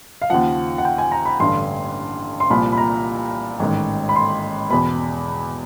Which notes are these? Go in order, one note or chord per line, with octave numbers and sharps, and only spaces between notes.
F5
D#2 C#3 F3 F#5
F#5
G5
G#5
A#5
B5
A1 G2 D3 C6
C6
C2 A#2 F3 B5
B5
A#5
A1 G#2 D#3
B5
C6
E2 B2 B5